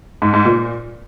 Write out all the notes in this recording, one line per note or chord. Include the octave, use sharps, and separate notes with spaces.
G#2
G#2
A#2